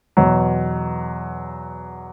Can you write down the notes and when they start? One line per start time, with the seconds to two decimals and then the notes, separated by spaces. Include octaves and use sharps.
0.17 E2 B2 F#3